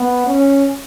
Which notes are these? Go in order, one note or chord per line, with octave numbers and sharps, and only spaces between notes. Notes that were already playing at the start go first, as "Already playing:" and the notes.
Already playing: B3
C#4